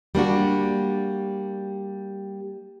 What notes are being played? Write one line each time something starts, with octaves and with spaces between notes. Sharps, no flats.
G3 A#3 D4 F#4